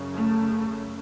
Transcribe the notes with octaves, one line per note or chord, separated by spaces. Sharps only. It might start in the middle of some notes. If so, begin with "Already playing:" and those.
Already playing: F#2 C#3
A3
F#2 C#3